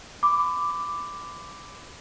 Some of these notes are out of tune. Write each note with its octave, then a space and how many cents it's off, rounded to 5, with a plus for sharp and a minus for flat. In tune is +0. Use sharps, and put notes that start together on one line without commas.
B5 +25 D6 +0